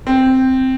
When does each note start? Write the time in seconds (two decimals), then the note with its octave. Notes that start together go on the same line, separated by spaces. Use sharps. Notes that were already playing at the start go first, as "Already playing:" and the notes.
0.07 C4